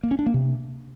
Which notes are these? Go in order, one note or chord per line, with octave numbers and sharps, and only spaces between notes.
A#3
C#4
D4
A#3
C3